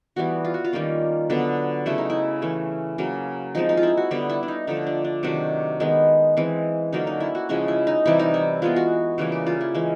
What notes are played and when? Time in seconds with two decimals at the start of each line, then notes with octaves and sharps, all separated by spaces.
0.16 E3 G3 B3 F#4
0.45 F4
0.54 F#4
0.65 F4
0.73 D#3 G3 A#3 C#4
1.30 D3 F#3 B3
1.86 C#3 F#3 A3 E4
1.98 D#4
2.10 E4
2.42 E3 A3 C#4
2.98 C#3 F#3 A#3
3.55 F3 G#3 C4 D#4
3.69 D#4
3.77 F4
3.83 E4
3.97 F#4
4.11 D3 G3 B3 E4
4.30 E4
4.43 D4
4.48 D#4
4.67 D3 F3 A3 D#4
4.87 D4
5.05 D4
5.23 C3 D#3 F#3 A3 D4
5.80 D#3 G#3 B3
6.37 E3 G#3 C4
6.93 D3 F#3 A#3 C#4 D#4
7.07 D#4
7.20 E4
7.35 F#4
7.49 C#3 F3 G#3 C#4 E4
7.68 E4
7.87 D#4
8.06 C3 E3 G3 E4
8.19 D#4
8.34 E4
8.62 E3 G#3 B3 F4
8.76 F#4
9.18 C#3 E3 G3 A#3 G#4
9.32 G4
9.47 F4
9.61 E4
9.75 E3 G#3 C#4